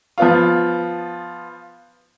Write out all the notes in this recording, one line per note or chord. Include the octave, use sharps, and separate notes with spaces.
F3 B3 F4